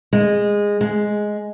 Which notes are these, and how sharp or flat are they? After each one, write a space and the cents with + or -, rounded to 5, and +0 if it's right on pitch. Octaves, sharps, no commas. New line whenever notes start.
G#3 -15
G#3 +5